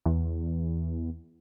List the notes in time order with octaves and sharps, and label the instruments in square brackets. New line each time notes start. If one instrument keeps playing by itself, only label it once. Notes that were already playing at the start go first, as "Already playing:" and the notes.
[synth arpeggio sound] E2